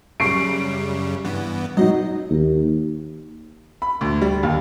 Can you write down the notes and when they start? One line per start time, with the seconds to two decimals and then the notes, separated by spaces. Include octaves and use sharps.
0.20 F#2 C#3 G3 C#6 C7 D7
1.25 G2 E3 B3
1.77 F#3 D#4 D#5
2.30 D#2
3.82 B5
4.01 D2
4.22 G3
4.43 D#2